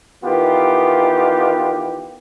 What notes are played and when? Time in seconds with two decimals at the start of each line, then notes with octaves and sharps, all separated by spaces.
0.24 D#3 E3 B3 F4 G4